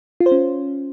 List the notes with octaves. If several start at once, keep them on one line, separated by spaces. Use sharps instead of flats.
F4
C5
C#4